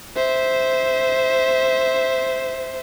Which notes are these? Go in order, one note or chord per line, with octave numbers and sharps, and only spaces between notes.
C5 E5